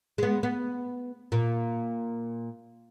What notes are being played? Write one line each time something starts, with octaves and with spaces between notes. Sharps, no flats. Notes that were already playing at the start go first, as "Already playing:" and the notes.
G#3 B3
B3
A#2